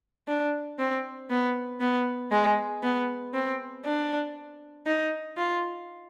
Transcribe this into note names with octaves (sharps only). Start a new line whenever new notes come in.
D4
C4
B3
B3
G#3
B3
C4
D4
D#4
F4